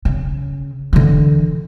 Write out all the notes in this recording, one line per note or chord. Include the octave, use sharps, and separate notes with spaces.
C#3
D3 E3